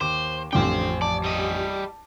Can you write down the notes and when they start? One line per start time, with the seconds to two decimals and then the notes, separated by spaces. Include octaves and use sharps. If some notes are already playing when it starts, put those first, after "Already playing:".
0.01 D#2 C5 D6
0.53 A1 F2 D3 F3 C5 G5 D6
1.02 D5 A5
1.24 G3 D#5